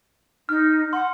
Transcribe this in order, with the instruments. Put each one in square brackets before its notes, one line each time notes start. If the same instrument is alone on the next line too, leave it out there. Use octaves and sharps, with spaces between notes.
[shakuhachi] D#4 [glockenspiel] F6
[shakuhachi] F#5 [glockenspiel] C6